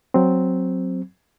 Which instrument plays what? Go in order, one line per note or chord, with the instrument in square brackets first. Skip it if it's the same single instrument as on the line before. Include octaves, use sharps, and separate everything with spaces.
[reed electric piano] F#3 C4